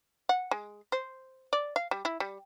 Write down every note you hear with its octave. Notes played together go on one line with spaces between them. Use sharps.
F#5
G#3
C5
D5
F5
G3
E4
G3